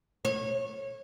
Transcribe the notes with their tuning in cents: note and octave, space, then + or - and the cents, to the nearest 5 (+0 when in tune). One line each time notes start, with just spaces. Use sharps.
C#5 -20